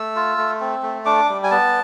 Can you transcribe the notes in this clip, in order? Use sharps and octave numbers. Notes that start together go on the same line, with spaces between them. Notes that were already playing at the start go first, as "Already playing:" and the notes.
Already playing: A3 E6
F4
A3
C4
A3
D4 D6
G3
G#5
B3 A5